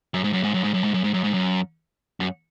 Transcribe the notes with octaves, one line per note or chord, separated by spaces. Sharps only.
F#2
G#2
F#2
G#2
F#2
G#2
F#2
G#2
F#2
G#2
F#2
G#2
F#2
F#2